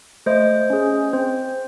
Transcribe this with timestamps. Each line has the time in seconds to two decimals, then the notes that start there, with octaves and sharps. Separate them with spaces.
0.26 A3 C5 D#5
0.70 C#4 G#4
1.13 C4 C5